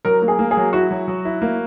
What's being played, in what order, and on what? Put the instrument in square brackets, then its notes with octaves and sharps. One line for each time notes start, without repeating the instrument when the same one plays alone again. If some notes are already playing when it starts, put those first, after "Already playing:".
[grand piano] F#3 [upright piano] A#4
[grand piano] A#3
[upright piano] G#4
[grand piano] A#3
[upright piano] G#4
[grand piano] F#3
[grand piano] E4 [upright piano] F#4
[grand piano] F#3
F#3
E4
A#3